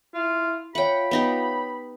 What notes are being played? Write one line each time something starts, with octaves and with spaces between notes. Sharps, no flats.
E4 F4
F4 C#5 E5 F#5 G5 B5
B3 D#4 G4